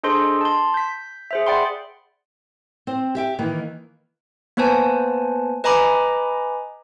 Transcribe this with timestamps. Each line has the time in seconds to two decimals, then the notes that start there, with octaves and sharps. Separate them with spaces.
0.03 D4 G#4 A4 C5 D#5 C6
0.41 A5 C6
0.74 G6 B6
1.31 G#4 C5 E5
1.46 D5 F#5 G5 B5 C6
2.87 C4 C5
3.15 G4 E5 G5
3.39 D#3 E3 A#3
4.57 A#3 B3 B4 C5 G#5 A5
5.64 B4 D#5 G#5 A#5 B5 D6